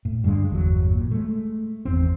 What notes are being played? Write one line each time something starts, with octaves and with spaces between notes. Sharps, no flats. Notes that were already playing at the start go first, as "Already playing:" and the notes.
A2
G2 D3 E3 G#3
G1 E2 F#3
A#2
G#3 A3
G#1 E2 C4